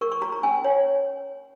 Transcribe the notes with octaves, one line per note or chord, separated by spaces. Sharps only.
A#4 C#6
C#6
F#4 A#5
A#5
C#4 G#5
C#5